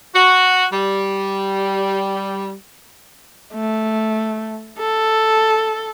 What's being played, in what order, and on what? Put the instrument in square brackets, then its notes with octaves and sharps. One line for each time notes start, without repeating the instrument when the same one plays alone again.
[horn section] F#4
G3
[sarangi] A3
A4